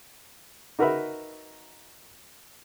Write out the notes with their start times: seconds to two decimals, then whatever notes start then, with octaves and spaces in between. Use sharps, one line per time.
0.79 D#4 F#4 A#4 B4 E5 B5